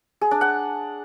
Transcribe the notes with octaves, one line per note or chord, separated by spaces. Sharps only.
G#4
D4
F#5